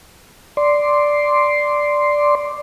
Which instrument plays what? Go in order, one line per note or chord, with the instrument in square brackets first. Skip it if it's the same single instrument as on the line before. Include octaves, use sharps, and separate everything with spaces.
[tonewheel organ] D5 C6